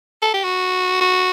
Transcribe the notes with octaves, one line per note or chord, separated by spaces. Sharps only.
A4
G4
F#4
F#4